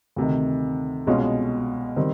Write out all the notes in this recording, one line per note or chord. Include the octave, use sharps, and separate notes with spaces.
D2 C3 D#3
C2 B2 G#3 C#4 F4
D#3 G3 C4